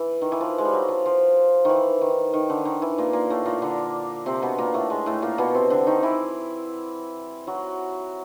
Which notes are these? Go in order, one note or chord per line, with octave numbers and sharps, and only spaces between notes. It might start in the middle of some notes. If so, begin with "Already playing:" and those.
Already playing: E3
D#3
E3
F3
G#3
G3
F#3
F3
F3
D#3 E3
D#3
D#3
D3
D#3
E3
A#2 A#3
A#2 A#3
A2 A3
A#2 A#3
D3 D4
C3 C4
B2 B3
A#2 A#3
A2 A3
G#3
A2 A3
A#2 A#3
B2 B3
C3 C4
D3 D4
D#3 D#4
E3 E4
F#3 F#4